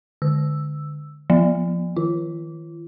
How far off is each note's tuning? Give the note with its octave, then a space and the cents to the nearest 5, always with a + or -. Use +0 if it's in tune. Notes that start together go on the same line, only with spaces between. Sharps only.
D3 +15 E6 +0
F3 +0 A#3 +40
D#3 +35 F4 -45